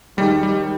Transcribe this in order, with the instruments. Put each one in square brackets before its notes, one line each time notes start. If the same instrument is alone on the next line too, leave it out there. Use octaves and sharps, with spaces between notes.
[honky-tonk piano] D#2 D#3 G#3 D#4 G4 [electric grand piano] G3
[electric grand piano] G3